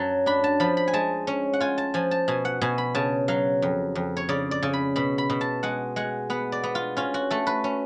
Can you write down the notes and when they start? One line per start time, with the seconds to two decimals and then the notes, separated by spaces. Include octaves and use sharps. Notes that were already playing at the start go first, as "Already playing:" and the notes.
Already playing: F#2 F#3 A5
0.26 D4 B5
0.44 A5
0.60 F3 B5
0.77 B5
0.88 G#5
0.93 G#3 A5
1.27 C#4
1.53 F#5
1.60 F4 G#5
1.78 A5
1.94 F3 G#5
2.11 A5
2.28 B2 G#5
2.45 F#5
2.61 B2 G#5
2.78 B5
2.95 C#3 A5
3.28 F#3 F5
3.62 F2
3.95 F2
4.17 C#5
4.29 C#3 D5
4.51 D5
4.63 C#3
4.73 B5
4.96 B2 B5
5.18 B5
5.30 B2
5.41 A5
5.63 G#3 F#5
5.96 G#3 F#5
6.30 B3 F#5
6.52 D5
6.64 B3
6.75 F4
6.97 C#4 F4
7.14 F#4
7.30 A3 A4
7.47 B4
7.64 C#4